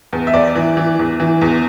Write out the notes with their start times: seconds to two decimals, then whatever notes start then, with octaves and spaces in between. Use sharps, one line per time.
0.13 E2
0.27 E5
0.34 E2 D5
0.55 E3
0.77 E3
0.99 E2
1.20 E3
1.41 E2